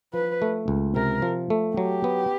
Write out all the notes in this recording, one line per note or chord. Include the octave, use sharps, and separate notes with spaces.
F3 B4
A3
C#2
C3 A#4
F3
A3
F#3 G4
B3